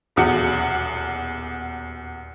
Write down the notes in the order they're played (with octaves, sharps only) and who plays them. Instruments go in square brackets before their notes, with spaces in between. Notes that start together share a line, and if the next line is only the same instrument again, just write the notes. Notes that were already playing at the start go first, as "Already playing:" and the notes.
[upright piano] D#1 B1 E2 F#4 C#7